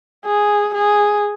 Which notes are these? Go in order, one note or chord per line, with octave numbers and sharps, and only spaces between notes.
G#4
G#4